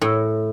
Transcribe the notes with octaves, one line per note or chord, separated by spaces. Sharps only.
A2